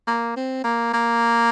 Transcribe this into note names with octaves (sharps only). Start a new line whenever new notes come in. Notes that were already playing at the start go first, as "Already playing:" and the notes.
A#3
C4
A#3
A#3